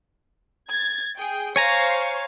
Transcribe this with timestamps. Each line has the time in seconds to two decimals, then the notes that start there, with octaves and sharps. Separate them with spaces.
0.69 G#6 A6
1.18 G#4 G5
1.56 C5 C#5 F5 G#5 A#5 C#6